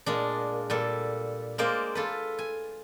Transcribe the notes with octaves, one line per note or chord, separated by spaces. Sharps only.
A#2 G#3 D4
A#2 G3 A4
G#3 A#3 C5 D5 F5
F4 A4 B4
G#5